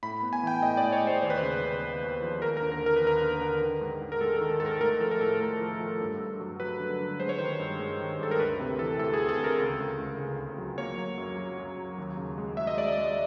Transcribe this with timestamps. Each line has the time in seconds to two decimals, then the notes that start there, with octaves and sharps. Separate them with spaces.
0.03 A2 B5
0.23 B3
0.33 G#5
0.43 E3 G5
0.62 A2 D#5
0.77 D5
0.83 A2
0.93 C#5
1.02 G#3 C5
1.22 D#2 C5
1.30 B4
1.38 C#3 C5
1.62 C#3
1.82 D#2
2.02 D#2
2.22 F3
2.42 D#2 A#4
2.57 A#4
2.62 D3
2.72 A#4
2.82 D#2 A#4
2.96 D#2 B4
3.07 A#4
3.21 D3
3.41 D3
3.62 D#3
3.81 G#2
4.01 G#2
4.12 A#4
4.21 G#3 A4
4.36 A4
4.41 D#3
4.51 A#4
4.60 G#2 A4
4.66 A#4
4.81 A3 A#4
5.00 F3 A4
5.11 A#4
5.21 A2 A4
5.40 A3 A#4
5.60 F3
5.80 F3
6.00 G2
6.20 G2
6.40 F#3
6.60 F#3 B4
6.80 D3
7.00 D3
7.20 G#3 C5
7.29 C#5
7.38 D#3 C5
7.60 G2
7.80 G#3
7.99 D#3
8.20 G2 A4
8.31 A#4
8.40 D2 B4
8.59 C3
8.79 E3 A4
8.99 D2 A4
9.14 G#4
9.19 D2
9.29 A4
9.39 D2
9.44 A#4
9.58 C#2
9.79 C#2
9.98 C#2
10.18 C#3
10.38 C#2
10.58 F#3
10.78 A#3 C#5
10.98 F#3
11.18 F#2
11.38 F#3
11.58 F#2
11.78 F#3
11.98 D#2
12.17 C#3
12.38 G#3
12.57 G#3 E5
12.67 D#5
12.77 G#3 D5
12.88 D#5
12.98 G#3